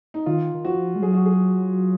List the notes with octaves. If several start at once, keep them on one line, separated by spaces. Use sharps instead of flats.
D#4
D#3 F4
D#3
F3 F#4
G#3
F#3 G#4
F#4
G#4